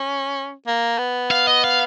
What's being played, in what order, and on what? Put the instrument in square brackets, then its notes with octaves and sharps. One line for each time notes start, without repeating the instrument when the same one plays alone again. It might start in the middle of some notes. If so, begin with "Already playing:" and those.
Already playing: [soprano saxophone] C#4
A#3
B3
[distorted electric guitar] F5
D#5
F5